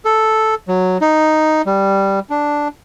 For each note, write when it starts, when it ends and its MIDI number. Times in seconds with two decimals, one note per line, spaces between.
0.05 0.55 69
0.68 0.98 54
1.01 1.62 63
1.66 2.19 55
2.30 2.68 62